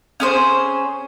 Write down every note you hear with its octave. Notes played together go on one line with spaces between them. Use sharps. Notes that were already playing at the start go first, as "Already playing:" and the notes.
C#4 G#4 C5